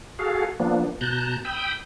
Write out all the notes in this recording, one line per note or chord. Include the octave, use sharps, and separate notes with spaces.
F#4 G#4 A4 F5
F3 A#3 B3 D4
B2 A5 A#5 F#6 G6
G5 B5 D#6 E6 G6